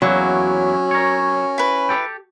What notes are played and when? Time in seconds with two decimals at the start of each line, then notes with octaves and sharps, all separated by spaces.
0.02 E2 F#3 A#3 C#4 E4
0.91 A#4 C#5
1.58 E4 B4
1.89 G4 A4 G5